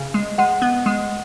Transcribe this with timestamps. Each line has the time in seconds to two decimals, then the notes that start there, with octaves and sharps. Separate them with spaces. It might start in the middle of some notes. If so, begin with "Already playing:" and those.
Already playing: C#3
0.14 G#3
0.38 G#3 F#5
0.62 B3
0.86 G#3